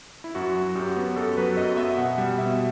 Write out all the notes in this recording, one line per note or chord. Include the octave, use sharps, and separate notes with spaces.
E4
F#2 F#4
F#3
F#2 G4
B3
F#2 A4
F#3 B4
F#2 D#5
B3 E5
B2 F#5
G3
B2 E5